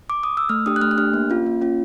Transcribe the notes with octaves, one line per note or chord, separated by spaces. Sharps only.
D6
D#6
E6
A3 F6
D4 G4 D#6
F#6
A3 F6
F#6
D4 G4 F6
A#3
C#4 F4
A#3
C#4 F4